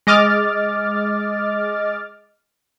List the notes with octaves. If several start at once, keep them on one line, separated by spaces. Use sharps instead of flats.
G#3 D#5 D6 F6 A6